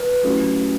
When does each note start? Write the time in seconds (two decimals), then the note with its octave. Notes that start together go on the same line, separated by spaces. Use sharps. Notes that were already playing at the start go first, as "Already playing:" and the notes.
Already playing: B4
0.23 F#3 A3 C#4 E4 G4